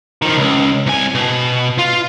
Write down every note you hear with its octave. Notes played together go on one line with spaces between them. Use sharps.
D#3 F3
C#2
C2 G#5
B2
F4